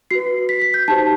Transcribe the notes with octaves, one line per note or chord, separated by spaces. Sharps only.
F#4 B4 C7
B6
B6
G6
D#4 G4 C5 A5